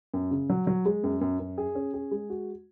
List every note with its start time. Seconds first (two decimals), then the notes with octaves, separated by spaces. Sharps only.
0.13 F#2
0.31 C#3
0.50 F#3
0.67 F#3
0.85 G#3
1.04 F#2
1.21 F#2
1.40 F#2
1.58 G#4
1.75 C#4
1.94 G#4
2.11 G#3
2.30 F#4